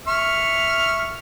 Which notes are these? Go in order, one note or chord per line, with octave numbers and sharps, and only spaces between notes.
E5 C#6 F6